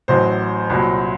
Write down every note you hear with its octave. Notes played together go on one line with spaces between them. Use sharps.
A1 A2 F#3 C5
C2 A#2 F#3